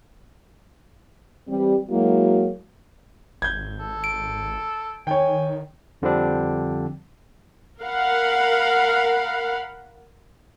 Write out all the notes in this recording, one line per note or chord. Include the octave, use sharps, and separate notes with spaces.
E3 G3 C4
F#3 G#3 A#3 E4 F#4
G#1 G6 G#6
A4
D7
D#3 C#5 G5 G#5
F2 D3 F3 G3 C4 D4
A#4 F5 F#5 B5